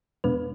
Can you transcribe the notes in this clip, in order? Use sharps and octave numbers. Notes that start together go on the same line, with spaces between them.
E2 B2 G#3 B3 D4 B4